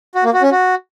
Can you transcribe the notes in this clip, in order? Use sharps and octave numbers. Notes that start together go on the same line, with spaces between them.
F#4
A#3
F#4
C#4
F#4